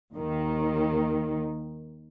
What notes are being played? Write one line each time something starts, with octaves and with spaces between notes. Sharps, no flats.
D#2 D#3